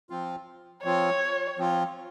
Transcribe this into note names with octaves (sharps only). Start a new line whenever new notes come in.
F3 C4 F4
F3 C4 F4 C#5
F3 C4 F4